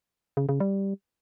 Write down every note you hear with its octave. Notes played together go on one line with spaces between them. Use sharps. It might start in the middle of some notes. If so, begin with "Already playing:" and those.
C#3
C#3
G3